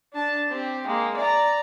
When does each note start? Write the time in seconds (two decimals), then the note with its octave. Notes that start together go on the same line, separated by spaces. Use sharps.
0.14 D4 A5
0.50 C4 G4
0.87 G#3 A#3
1.17 D5 A#5